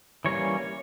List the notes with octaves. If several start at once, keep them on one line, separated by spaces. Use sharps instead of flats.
E3 G3 A#3 C#4 C#5